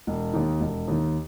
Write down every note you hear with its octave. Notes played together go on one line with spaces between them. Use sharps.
E1
D#2 D#3
E1
D#2 D#3